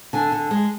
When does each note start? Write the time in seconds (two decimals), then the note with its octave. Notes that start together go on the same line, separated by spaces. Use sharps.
0.13 D3 G#5
0.32 D3
0.51 G#3